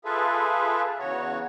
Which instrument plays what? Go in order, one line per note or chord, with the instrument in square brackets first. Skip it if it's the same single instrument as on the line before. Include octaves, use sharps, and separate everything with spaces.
[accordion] F4 G#4 A4 B4 E5
E2 C#3 F#4 C#5